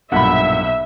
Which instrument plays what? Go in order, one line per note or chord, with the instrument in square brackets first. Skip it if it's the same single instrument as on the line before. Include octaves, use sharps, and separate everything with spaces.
[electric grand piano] B1 [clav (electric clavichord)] G2 A#2 [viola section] E5 [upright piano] F#5 B5